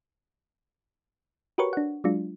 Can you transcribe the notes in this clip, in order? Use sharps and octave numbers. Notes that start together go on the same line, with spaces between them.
F#4 G4 A#4 B4 C#5 C#6
D4 F#5
F#3 G#3 D4 F4